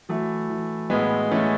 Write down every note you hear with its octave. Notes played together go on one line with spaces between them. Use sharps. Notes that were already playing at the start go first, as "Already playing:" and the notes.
E3 F#3 A3
E3
A2 G#3 B3
E3 A3 C#4